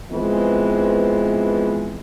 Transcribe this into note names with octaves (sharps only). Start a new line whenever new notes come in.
E3 F3 G#3 B3 C4